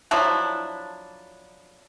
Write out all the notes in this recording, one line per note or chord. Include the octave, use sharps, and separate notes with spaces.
F3 F#3 D4 E4